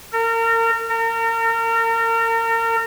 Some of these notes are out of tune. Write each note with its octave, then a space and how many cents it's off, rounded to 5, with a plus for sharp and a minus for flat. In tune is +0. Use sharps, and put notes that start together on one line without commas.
A#4 -35
A#4 -35